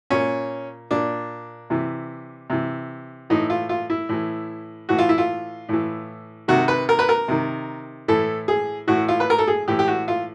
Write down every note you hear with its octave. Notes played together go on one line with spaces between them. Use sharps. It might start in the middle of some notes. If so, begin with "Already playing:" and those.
A#2 C#4
A#2 D4
C3 E3
C3 E3
A2 E3 D#4
F4
F4
E4
A2 E3
A2 E3 F#4
F4
E4
F4
A2 E3
C3 D#3 F#4
B4
A#4
B4
A#4
C3 D#3
A2 E3 A4
G#4
A2 E3 F#4
F4
B4
A#4
A4
G#4
A2 E3 G4
G4
F#4
F4